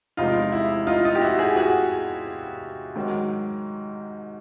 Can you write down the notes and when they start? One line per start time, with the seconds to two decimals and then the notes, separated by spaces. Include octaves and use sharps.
0.17 E2 C3 F3 G#3 D#4 F4
0.52 E4
0.87 D#4 F4
1.05 D#4 F4
1.15 G4
1.21 E4 F#4
1.39 F#4 G#4
1.56 F#4 G#4
2.96 G#2 D#3 F#3